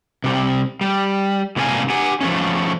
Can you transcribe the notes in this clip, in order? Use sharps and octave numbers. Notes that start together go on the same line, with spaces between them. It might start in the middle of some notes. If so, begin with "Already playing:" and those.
C3 G3
G3
A2 C3 G3 A#3 C#5 G#5
G4 F#5 G#5
F3 A3 C#4